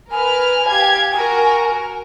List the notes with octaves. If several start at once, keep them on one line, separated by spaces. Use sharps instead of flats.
A#4 B4 G#5 F6
G4 F5 G#6
F#4 A#4 G#5